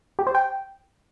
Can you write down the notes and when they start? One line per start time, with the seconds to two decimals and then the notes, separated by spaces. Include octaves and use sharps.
0.19 G4
0.27 C5
0.35 G5